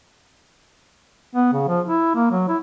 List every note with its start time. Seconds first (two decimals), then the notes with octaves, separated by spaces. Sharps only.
1.35 B3
1.53 C#3
1.68 F3
1.86 E4
2.15 A#3
2.31 F#3
2.49 E4